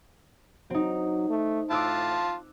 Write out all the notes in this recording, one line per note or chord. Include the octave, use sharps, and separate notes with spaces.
F#3 C4 D#4
A3
A2 F4 A5 D6 E6 F#6